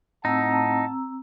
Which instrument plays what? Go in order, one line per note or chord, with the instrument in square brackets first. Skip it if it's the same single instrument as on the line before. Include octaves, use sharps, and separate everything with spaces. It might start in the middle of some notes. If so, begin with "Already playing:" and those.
[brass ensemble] A2 F#5 A5 [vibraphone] C4 A#5 E6 [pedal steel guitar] D#4